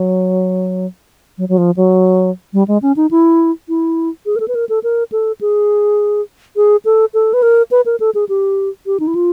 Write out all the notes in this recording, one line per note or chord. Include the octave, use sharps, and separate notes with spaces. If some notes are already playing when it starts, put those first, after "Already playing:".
Already playing: F#3
F#3
F#3
F3
F#3
G3
G#3
C#4
D#4
E4
E4
G#4
A#4
A4
B4
A#4
A4
A#4
A4
G#4
G#4
A4
A4
B4
A#4
B4
A#4
A4
G#4
G4
G4
D#4
E4
F4